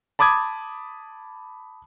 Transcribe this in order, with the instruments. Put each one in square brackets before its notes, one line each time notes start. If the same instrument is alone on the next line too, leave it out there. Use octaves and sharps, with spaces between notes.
[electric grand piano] A5 B5 D6 D#6 G#6